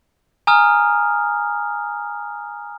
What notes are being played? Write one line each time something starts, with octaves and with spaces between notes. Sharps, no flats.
G#5 A#5 D#6 F6